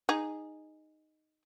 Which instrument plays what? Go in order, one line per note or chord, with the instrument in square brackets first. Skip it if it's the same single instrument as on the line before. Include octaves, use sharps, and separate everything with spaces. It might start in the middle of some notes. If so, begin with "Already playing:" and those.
[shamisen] D#4 G#4